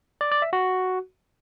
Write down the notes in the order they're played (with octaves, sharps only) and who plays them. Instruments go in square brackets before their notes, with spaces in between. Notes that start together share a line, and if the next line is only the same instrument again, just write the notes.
[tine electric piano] D5
D5
E5
F#4